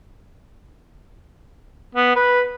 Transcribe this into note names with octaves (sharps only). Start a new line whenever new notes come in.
B3
B4